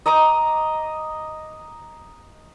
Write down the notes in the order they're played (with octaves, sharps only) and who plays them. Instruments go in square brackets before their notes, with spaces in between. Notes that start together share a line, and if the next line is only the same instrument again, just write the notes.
[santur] D#5 A#5 D6 D#6